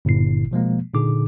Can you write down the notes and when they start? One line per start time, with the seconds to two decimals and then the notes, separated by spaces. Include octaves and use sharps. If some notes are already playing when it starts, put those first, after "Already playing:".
0.05 G1 A#2 E4 C7
0.51 B2 F3 G#3 A#3
0.94 A#2 D3 D#4 G#4 D6